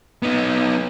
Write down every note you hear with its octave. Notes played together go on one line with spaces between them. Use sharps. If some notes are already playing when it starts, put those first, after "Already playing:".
B3 D#4